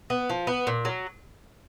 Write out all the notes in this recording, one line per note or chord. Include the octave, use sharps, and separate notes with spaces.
B3
F3
B3
A#2
F#3